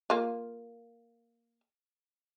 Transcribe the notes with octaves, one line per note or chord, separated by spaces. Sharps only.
A#3 F4